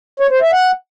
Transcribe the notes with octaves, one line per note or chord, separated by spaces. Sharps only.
C#5
C5
E5
F#5